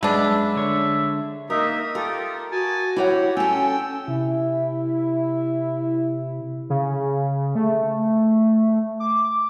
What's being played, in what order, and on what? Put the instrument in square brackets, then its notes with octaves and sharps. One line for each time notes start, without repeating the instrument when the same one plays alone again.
[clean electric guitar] F#2 B4 [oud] G#3 [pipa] B3 D4 [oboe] E5
[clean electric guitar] D3 C#5
[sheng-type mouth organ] A#3 D#4 E5 [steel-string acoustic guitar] A#4 [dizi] D#6
[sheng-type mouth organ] F4 G4 A4 [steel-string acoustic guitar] A#4
[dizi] F#4 [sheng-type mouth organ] G#5 A5
[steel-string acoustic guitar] E4 C#5 F#5 [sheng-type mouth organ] G4
[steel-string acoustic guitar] C#4 A4 [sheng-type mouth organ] G5 E6 [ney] G#5
[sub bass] C3 [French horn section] E4
[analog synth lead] C#3
A3
D6